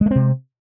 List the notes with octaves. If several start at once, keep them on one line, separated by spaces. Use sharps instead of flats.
C3 G#3 A3 C4